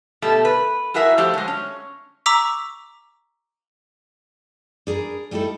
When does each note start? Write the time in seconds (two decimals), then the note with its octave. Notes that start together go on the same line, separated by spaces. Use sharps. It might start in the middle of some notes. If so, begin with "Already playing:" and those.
0.22 B2 A3 G4
0.45 B4
0.94 E4 F#4 G#4 A#4 E5
1.18 F3 A3 G4 C5
1.34 F#3 G#3
1.48 C#4
2.26 A#5 C#6 D6 E6 B6
4.87 D4 G#4 A#4 B4
5.31 G3 A3 D#4 E4 A4